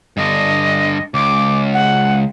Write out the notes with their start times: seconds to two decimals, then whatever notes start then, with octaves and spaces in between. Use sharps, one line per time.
0.17 G2 D3 D#5
1.14 C#2 D6
1.73 F#5